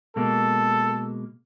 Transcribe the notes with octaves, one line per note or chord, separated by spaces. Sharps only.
B2 G#3 A#3 A4